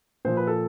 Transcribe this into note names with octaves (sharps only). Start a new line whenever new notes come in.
A#2 F3 C5
B4
A4